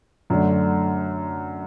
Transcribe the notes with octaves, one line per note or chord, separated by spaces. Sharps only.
F#2 D3 A3 D4